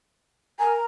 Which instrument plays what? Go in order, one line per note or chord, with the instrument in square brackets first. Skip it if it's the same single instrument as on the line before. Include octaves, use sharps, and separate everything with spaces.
[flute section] A#4 A#5 [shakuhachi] G#5